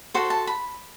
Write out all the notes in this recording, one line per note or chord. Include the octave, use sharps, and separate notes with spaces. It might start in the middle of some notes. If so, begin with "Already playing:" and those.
F#4 A4 C5 C6
A5
B5